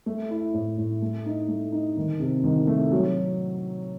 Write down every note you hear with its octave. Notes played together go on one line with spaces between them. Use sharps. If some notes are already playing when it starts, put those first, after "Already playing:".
A3
E4
A2
A2
A3
D#4
A3
D#4
D#3
C3
D#3
A3
F#3